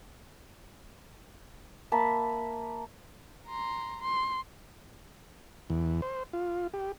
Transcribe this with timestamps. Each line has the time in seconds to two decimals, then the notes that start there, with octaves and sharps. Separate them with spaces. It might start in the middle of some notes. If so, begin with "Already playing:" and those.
1.92 A#3 E5 A5 B5
3.47 A#5 C6
4.02 C6
5.70 E2
6.02 C5
6.33 F4
6.74 G4